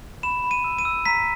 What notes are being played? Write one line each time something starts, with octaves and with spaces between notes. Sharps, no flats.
B5 E7
B5
D#7
E6
D#7
E6
A#5 B6